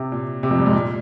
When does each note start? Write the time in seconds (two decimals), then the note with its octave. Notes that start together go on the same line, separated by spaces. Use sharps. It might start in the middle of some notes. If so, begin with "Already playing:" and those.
Already playing: C3
0.12 A#2
0.43 C3
0.51 F2
0.59 G2
0.66 G#2
0.73 A#2